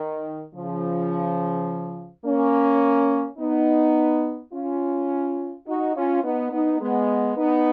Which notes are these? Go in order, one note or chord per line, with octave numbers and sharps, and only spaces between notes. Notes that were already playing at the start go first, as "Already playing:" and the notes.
Already playing: D#3
C#3 F3
A#3 C#4
B3 D#4
C#4 F4
D#4 F#4
C#4 F4
B3 D#4
B3 D#4
G#3 B3
B3 D#4